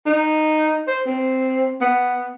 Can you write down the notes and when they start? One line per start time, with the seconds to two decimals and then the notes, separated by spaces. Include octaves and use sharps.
0.06 D#4
0.88 C5
1.06 C4
1.81 B3